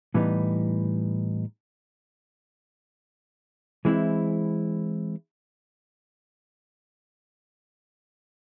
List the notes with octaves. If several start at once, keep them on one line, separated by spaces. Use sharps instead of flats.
A2 E3 G3 B3 D#4
E3 G#3 C4 E4